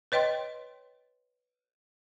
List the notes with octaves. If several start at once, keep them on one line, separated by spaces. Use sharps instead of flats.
B4 C#5 D#5 G5 C6